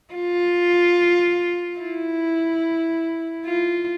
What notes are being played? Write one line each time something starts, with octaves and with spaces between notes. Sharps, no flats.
F4
E4
F4